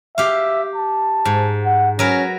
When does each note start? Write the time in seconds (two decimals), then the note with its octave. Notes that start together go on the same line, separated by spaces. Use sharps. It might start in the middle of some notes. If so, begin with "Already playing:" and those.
0.18 G4 E5 F5
0.76 A5
1.25 G#2
1.65 F#5
1.99 F#3 C#4 A#4 B4